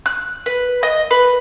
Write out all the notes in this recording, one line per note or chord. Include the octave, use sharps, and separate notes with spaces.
F#6
B4
D#5
B4